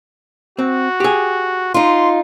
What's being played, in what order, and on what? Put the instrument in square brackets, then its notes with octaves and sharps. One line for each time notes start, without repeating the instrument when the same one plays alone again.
[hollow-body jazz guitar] C4 [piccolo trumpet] F#4
[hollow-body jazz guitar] G4 G#4
[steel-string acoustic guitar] D#4 F4 [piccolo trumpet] C6